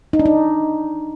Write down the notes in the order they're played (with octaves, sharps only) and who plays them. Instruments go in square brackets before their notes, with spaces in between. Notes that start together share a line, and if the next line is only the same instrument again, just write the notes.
[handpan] D#4
D4
D#4